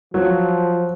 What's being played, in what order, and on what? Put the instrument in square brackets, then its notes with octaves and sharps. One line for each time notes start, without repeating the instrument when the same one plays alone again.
[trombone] F3 [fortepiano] F#3